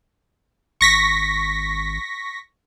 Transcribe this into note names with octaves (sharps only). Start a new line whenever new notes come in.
G#1 C#6 A#6 B6